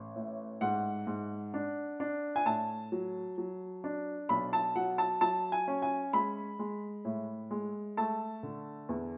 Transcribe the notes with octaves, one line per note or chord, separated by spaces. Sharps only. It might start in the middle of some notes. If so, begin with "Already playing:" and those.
Already playing: A1
A2
G#2 F#5
G#2
D4
D4
G#5
A2 A5
F#3
F#3
D4
B1 B5
A5
F#3 F#5
A5
F#3 A5
G#5
C#4
G#5
G#3 B5
G#3
A2
G#3
A3 A5
D3
E2